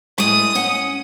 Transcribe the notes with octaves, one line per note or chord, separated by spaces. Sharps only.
A2 G#3 D#6
C#4 F#5